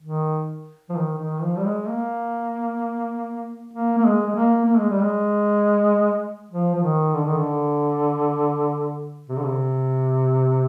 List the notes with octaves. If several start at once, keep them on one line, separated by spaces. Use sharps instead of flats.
D#3
F3
D#3
D#3
F3
G3
G#3
A#3
A#3
A#3
G#3
G#3
A#3
A#3
G#3
G3
G#3
F3
F3
D#3
D3
D#3
D3
C3
D3
C3